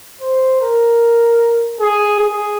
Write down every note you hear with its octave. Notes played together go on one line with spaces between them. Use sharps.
C5
A#4
G#4
G#4